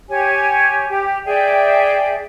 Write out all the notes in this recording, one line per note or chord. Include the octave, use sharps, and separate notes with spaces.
G4 C#5 G#5
G4
G#4 D5 E5 G5